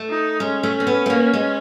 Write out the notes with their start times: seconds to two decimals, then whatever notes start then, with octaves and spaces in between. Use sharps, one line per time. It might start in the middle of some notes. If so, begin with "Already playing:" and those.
Already playing: A3
0.10 D#4
0.40 G#3 C#4
0.63 A3
0.80 C4
0.87 B3
1.06 A3
1.10 A#3
1.33 G#3